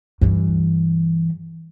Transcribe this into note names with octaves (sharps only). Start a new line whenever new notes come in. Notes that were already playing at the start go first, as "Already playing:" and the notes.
G2 E3